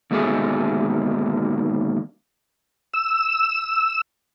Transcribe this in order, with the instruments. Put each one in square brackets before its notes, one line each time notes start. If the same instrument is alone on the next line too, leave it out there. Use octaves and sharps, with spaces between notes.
[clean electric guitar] D#2 G#2 B2 D3 A3 G#4
[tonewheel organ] E6